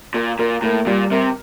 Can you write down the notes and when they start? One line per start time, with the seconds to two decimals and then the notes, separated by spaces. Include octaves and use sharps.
0.14 A#2 A#4
0.39 A#2 A#4
0.62 A2 A#3
0.87 A#2 G3
1.11 C3 A#4